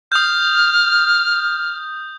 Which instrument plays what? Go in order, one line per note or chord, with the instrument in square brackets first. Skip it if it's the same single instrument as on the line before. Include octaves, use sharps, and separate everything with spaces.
[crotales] D#6 G6 [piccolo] F6